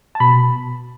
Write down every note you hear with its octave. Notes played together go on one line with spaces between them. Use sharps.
A5
B2 B5